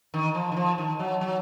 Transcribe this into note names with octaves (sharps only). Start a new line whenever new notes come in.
D#3
F3
D#3
F3
D#3
F#3
F#3